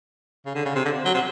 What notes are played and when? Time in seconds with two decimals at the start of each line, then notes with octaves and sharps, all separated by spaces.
0.46 C#3
0.55 D3
0.65 C#3
0.75 C3
0.85 D3
1.05 F#3
1.14 C3